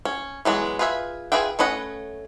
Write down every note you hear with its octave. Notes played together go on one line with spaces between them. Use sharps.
C#4
E3 F#3 G#3 B3
F4 G#4 B4 C5 E5
F4 G#4 B4 E5 G5
A3 C#4 B4 D#5 F#5